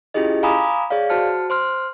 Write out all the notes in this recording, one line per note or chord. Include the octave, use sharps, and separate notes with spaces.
C#4 E4 F4 G4 G#4 D#5
F5 G#5 A#5 B5 D6 D#6
G#4 C#5 D5 F5
F#4 C5 A5 F6 C#7
C5 C6 F6